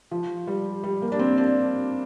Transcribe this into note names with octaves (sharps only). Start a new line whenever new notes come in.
F3
G3
G3
A#3
D4
C4
D4